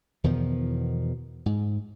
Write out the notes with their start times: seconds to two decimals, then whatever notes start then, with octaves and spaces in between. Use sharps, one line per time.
0.24 E2 B2 D#3 F3
1.46 G#2